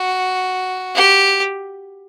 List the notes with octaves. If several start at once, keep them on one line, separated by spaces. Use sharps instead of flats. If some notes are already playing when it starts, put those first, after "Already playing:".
Already playing: F#4
G4